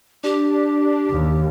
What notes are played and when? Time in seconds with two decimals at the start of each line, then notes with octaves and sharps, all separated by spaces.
0.24 D4 G4
1.08 D#2 D#3